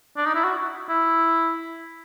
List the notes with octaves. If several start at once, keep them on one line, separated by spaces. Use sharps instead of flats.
D4
D#4
E4
F#4
E4